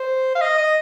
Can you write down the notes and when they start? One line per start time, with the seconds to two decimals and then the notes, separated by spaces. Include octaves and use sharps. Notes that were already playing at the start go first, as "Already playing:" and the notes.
Already playing: C5
0.35 F5
0.42 D#5
0.58 D#5